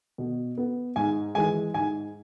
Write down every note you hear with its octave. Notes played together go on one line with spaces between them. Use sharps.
B2
B3
G#2 G#5
E3 G#3 G#5
G#2 G#5